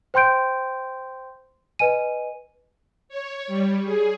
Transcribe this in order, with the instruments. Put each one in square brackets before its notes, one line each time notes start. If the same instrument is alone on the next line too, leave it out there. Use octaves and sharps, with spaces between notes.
[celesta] C5 G5 C6 G6 D7
B4 D#5 G#5 D#7
[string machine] C#5
G3
G#4